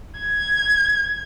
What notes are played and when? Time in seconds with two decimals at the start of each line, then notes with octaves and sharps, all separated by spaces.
0.19 G#6